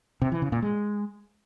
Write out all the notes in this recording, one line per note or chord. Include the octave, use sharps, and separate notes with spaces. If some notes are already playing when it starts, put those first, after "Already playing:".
C3
E3
C#3
A#2
G#3